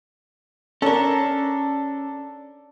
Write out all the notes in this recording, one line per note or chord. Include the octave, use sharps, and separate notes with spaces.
C#4 D4 A4 A#4